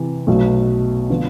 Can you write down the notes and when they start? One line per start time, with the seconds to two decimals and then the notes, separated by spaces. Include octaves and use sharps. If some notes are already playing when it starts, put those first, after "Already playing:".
Already playing: C3 E3
0.27 B1 B2 A3
1.10 D3 F3 B3 F4